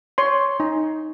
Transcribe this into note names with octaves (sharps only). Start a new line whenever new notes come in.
C#5 C6
D#4